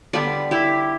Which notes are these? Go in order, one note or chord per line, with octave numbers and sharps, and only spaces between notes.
D3 G3 B3 D5 F#5
E4 G4